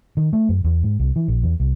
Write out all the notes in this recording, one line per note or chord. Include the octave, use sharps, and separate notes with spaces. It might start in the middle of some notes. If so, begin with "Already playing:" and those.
D#3
A3
F#2
E2
G#2
C2
E3
A#1
E2
C2